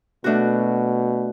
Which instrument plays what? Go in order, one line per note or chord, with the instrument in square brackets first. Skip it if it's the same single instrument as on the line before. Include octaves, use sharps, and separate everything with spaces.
[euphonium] B2 [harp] A3 D4 F#4